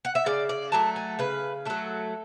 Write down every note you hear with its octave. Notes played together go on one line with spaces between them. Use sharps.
F#5
E5
C#3 D5
D5
F#3 A3 A5
G#5
C#3 B4
F#3 A3 A4